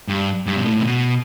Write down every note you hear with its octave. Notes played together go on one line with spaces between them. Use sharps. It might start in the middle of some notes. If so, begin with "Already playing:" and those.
G2
G2
B2
A2
C3
B2